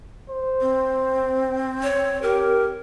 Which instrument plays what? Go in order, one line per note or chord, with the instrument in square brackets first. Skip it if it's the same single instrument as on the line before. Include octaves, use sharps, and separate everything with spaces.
[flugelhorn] C5
[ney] C4
[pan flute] C#5
[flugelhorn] G4 [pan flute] A#4